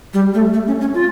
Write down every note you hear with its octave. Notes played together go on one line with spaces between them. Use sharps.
G3
A3
A3
C#4
C#4
F4